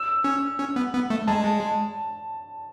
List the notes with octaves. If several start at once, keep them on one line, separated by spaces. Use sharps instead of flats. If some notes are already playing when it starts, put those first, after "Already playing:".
Already playing: E6
C#4
C#4
B3
B3
A3
G#3 A5